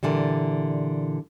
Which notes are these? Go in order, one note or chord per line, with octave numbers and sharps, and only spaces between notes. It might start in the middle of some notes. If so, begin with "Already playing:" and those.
A#2 D3 E3 G3